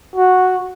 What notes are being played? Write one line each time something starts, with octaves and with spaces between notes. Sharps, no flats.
F#4